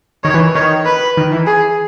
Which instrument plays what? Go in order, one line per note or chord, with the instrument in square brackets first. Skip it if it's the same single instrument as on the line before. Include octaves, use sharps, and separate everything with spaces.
[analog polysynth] D#3 [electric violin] C#5
[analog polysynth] E3
[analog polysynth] D#3 [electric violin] C#5
[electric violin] B4
[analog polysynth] D#3
E3
[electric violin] G#4